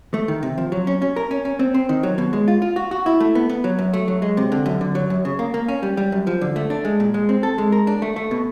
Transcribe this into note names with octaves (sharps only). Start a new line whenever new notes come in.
A3
D#3
C3
F3
F#3
C#4
C#4
A#4
C#4
C#4
C4
C4
D#3
F#3
B2
G#3
F4
F4
F#4
F#4
E4
A3
B3
B3
F#3
F#2
A3
F#3
G#3
C3
D3
F#2
D3
F#3
F#2
C#3
A#3
A#3
C#4
G3
G3
F#2
F3
D3
A3
D4
G#3
A#2
G#3
C4
A4
G#3
A#4
D4
A3
A3
B2